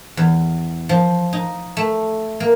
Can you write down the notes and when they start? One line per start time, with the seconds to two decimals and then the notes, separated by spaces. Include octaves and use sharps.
0.17 E2
0.89 F3
1.33 D#4
1.77 A3
2.40 A#3